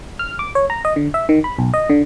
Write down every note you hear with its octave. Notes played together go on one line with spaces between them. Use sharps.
F6
D6
C#5
A#5
D#5
D3
E5
D#3
B5
B1
D#5
D3